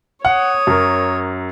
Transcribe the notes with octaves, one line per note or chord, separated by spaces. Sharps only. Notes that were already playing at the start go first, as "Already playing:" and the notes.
C#5 F#5 D#6
F#2 A#4